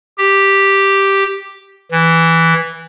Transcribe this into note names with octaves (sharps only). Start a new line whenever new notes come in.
G4
E3